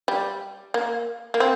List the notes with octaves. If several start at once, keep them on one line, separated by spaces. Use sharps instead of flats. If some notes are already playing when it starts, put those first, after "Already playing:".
G3
A#3
A#3
C4